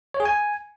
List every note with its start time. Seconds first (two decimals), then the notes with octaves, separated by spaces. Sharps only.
0.14 C#5
0.20 G#4
0.25 G#5